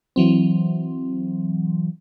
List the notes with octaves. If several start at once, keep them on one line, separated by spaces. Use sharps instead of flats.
E3 F#3 C4